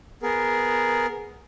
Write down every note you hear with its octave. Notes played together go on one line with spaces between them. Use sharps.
B3 G#4 A#4